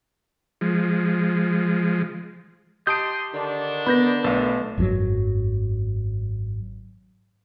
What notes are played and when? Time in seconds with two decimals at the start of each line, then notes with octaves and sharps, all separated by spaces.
0.61 F3 G#3
2.87 G4 D#5 A5 C6 D#6 G6 D7
3.33 D3 D#3 D4
3.86 B3 B5 G6 A#6
4.24 B1 A3 A4 F5
4.78 G#1 F#2 C#3 F#3